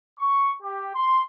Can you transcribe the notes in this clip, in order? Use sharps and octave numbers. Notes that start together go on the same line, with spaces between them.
C#6
G4
C6